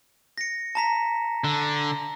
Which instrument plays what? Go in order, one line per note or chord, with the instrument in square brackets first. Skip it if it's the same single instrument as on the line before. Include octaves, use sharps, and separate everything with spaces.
[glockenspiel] A#6 C#7
A5 A#5 B6
[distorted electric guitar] D3